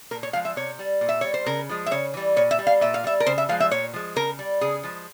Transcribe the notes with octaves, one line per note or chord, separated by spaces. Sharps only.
A#2 A#4
C#5
F3 G#3 F5
E5
C3 C#5
G3
A#2
E5
G3 C#5
C5
C#3 A#4
F3 G#3
E5
C#3 C#5
E3 G3
A#2 C#5
E5
G3
F5
A#2 E5
F5
G3 E5
A#4
C#3 C5
E5
F3 G#3 F5
E5
A#2 C#5
F3 G#3
C#3 A#4
G3
C#3 G#4
F3 G#3